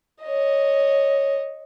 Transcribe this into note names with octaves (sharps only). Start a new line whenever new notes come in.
C#5 D#5